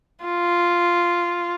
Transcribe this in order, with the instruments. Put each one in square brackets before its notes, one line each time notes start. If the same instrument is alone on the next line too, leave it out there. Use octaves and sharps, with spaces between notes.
[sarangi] F4